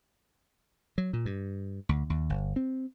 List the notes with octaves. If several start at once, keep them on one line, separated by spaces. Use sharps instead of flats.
F#3
A#2
G2
D2
D#2
G1
C4